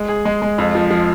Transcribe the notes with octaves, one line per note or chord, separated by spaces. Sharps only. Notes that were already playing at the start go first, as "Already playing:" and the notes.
Already playing: G#3
G#4
G#3
G#3
F2
F3
F3